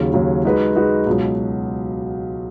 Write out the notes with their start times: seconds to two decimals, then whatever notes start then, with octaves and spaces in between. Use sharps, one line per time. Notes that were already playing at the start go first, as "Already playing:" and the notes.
Already playing: D#2 C#3 F#3
0.14 D#2 C#3 F#3
0.45 G#3 D#4 F#4 B4
0.75 G#3 D#4 F#4 B4
1.07 C#2 B2 F#3